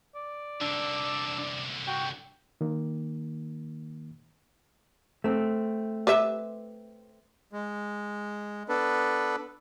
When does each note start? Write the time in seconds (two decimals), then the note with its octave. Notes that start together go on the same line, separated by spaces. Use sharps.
0.16 D5
0.61 C2 D3 D4 E6
1.87 F#4 G5
2.61 D#3 A#3
5.24 A3 C4
6.07 G4 B4 E5
7.53 G#3
8.69 B3 D4 A4 B4